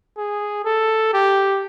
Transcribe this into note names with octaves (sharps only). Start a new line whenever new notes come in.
G#4
A4
G4